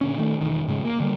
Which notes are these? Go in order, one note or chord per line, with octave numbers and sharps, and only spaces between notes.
A#2 D3 C#4
D#3 A3
E1 F2 D#3
G#2 C#3 G#3
A#3
D3 G3 A#3